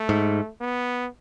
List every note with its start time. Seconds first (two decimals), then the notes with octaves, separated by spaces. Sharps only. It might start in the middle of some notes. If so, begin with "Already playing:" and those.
Already playing: A3
0.09 G#2
0.61 B3